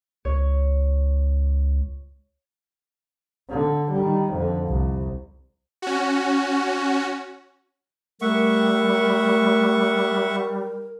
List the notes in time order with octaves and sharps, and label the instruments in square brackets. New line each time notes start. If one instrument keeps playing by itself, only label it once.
[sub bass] C#2 [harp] C#5
[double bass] D3
D#3 G3
F2 D3
C2
[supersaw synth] C#4 F#4
[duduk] G3 [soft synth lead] A3 [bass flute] A#4 [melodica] E5 F#5 C#6